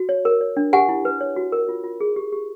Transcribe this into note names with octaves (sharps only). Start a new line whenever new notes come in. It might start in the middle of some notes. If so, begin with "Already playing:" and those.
Already playing: F#4
C#5
A#4
C#5
D4
G4 F#5 G#5
E4
B4
C#5
F#4
A#4
F4
F4
G#4
G4
G4